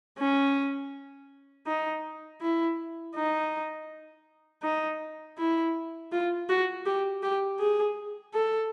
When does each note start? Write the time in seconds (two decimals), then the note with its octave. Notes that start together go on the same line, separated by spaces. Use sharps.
0.19 C#4
1.67 D#4
2.42 E4
3.16 D#4
4.63 D#4
5.38 E4
6.12 F4
6.49 F#4
6.86 G4
7.23 G4
7.60 G#4
8.34 A4